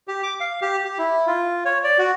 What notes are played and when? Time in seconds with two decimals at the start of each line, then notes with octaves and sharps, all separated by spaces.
0.08 G4
0.23 D6
0.40 F5
0.62 G4
0.84 G4
0.98 E4
1.27 F4
1.65 C#5
1.84 D5
1.98 F#4